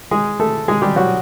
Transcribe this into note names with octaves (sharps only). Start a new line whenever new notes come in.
G#3 G#4
A3 A4
G#3 G#4
G3 G4
F#3 F#4